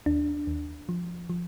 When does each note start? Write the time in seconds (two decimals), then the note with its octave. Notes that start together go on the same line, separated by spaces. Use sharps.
0.06 D#2 D4
0.47 D#2
0.89 F3
1.30 F3